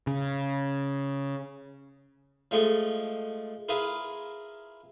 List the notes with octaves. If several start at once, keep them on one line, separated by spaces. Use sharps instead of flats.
C#3
F3 G#3 A3
E4 F4 G#4 A#4 B4